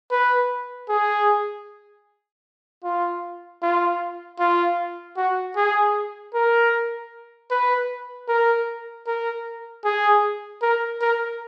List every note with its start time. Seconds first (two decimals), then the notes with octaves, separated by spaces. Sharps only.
0.11 B4
0.89 G#4
2.84 F4
3.62 F4
4.40 F4
5.17 F#4
5.56 G#4
6.34 A#4
7.51 B4
8.28 A#4
9.07 A#4
9.84 G#4
10.62 A#4
11.01 A#4